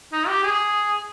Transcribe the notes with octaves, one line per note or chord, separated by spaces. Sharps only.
D#4
G4
G#4